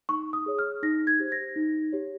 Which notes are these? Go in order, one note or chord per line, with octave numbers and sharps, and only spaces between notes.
D#4 C#6
D#6
G#4 C#5
F6
D#4 A#6
G#6
G4 C5
A#6
D#4
G4 C#5